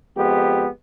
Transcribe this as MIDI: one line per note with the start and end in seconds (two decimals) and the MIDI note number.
0.16 0.66 41
0.16 0.66 56
0.16 0.66 59
0.16 0.66 67